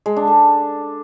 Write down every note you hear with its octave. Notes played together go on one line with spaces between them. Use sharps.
G#3
D4
A4